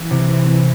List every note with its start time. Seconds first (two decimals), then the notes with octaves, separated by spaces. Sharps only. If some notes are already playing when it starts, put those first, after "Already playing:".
Already playing: E3
0.11 C3
0.28 C4
0.46 C4